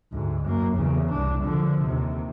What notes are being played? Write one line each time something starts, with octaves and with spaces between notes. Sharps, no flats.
D2 G#2
F#2 A#3
E2 C#3
C2 D4
D3 F3
D#2 C3